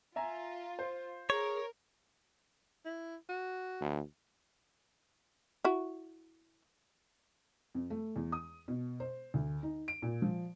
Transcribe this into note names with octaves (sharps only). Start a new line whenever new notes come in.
F4 E5 G#5 A#5
C5
G#4 A#4 C#5
E4
F#4
D2
E4 F#4
F2
A3
E2
D#6
B2
C5
D2
D#4
D7
A#2
F3